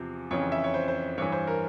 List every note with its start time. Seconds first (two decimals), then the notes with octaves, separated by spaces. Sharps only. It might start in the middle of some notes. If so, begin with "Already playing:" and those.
Already playing: E2 C3 F3
0.31 F2 C#3 E3 C#5
0.52 E5
0.64 C#5
0.74 C5
0.88 C5
1.18 G2 E3 C#5
1.32 C5
1.47 A#4